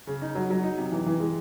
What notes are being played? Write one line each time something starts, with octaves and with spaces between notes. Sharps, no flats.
C#3
D#4
F#3
F#3
D#4
C3
E3
E3
G#3